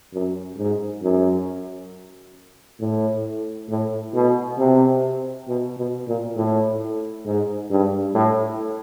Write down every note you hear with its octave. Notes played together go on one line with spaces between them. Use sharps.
F#2
G#2
F#2
A2
A2
B2
C3
B2
B2
A#2
A2
G#2
G2
A2